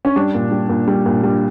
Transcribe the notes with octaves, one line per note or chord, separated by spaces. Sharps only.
C#4
G3 D4
A#2
G3
A#2
G3
A#2
G3